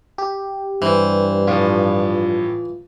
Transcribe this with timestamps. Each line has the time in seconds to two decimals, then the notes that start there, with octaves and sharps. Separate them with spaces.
0.18 G4
0.82 G2 E3 C5
1.47 A2 F3 F4